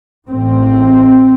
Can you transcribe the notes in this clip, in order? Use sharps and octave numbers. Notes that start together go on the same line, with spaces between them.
A1 A2 C4